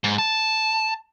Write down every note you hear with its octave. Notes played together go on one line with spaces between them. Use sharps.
G#2
A5